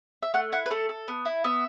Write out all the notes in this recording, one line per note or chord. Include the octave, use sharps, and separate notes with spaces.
E5
A3 F#5
E4 F#5
B4
A3 A4
A4
B3
E4
B3 E5